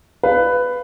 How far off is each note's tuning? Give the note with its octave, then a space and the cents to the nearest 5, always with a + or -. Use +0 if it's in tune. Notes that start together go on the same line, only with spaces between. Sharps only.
B4 +10 F5 +0